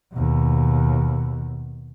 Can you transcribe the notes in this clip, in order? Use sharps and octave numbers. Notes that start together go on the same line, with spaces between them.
D#2 B2